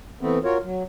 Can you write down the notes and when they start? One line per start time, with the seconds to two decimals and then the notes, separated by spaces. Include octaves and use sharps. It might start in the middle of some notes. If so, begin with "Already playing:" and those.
0.21 E3 A3 B3 C4
0.44 F4 F#4 A#4 C#5
0.63 F#3